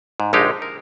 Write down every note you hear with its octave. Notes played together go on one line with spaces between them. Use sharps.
G#2
A#1 D3 G#3 D#4 G4 F5
A#4